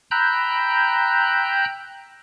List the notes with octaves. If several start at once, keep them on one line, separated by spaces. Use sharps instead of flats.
G5 A#5 B5 E6 F#6 G6